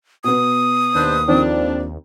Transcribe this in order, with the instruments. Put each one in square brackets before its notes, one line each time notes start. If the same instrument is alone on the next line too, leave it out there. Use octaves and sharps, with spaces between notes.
[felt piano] B2 B3 [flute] D#6
[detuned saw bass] D#2 [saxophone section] D4 B4 C5
[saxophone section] F2 F3 D4 [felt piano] D#3 C4